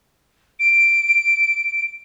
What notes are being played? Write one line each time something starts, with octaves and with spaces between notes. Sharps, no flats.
D7